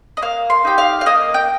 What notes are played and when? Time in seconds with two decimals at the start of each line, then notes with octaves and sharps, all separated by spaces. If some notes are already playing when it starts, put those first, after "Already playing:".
0.17 D#5
0.22 A#3 F5
0.50 C6
0.65 D#4 G4 G5
0.78 F5
1.01 F5
1.06 A#3 D#5
1.34 G5